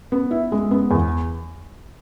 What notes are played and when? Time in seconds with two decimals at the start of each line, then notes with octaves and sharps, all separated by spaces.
0.12 B3
0.31 E4
0.52 G#3
0.71 B3
0.91 E2